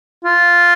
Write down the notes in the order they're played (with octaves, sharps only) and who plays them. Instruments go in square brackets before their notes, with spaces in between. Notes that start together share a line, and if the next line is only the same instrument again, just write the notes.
[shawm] F4